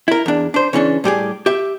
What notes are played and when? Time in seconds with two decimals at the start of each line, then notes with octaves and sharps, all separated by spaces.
0.08 E4 A#4
0.26 E2 D4
0.54 D4 C5
0.73 C#3 E3 C#4 D4
1.04 A2 G3 G4 G#4
1.46 G4 E5